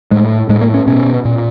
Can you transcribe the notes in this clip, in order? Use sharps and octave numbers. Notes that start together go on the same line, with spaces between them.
A2 G#3
A2 G#3
A#3
C#4
B2 C#4
A#2